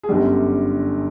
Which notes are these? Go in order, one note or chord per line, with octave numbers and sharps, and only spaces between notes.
G#4
G1 F#2 D3 G3 G4